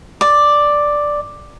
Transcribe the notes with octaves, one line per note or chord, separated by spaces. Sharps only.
D5